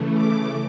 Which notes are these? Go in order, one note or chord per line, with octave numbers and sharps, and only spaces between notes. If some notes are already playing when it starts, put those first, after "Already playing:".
Already playing: C#3 E3 A3
D6